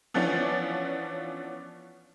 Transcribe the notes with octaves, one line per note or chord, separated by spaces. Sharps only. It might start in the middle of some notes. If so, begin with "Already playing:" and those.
E3 F3 B3 C#4 D4